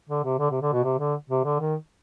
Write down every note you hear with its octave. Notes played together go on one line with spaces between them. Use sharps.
D3
C3
D3
C3
D3
B2
C3
D3
C3
D3
D#3